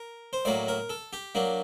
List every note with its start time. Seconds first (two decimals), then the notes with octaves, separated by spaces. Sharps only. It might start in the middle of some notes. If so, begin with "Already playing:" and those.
Already playing: A#4
0.33 C5
0.45 A2 F#3 A#3 D5
0.68 A#4
0.89 A4
1.13 G4
1.35 F#3 A#3 D4